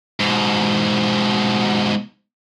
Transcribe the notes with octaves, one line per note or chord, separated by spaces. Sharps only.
G#2 B2